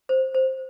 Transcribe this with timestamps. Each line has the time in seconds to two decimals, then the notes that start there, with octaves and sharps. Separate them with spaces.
0.09 C5
0.34 C5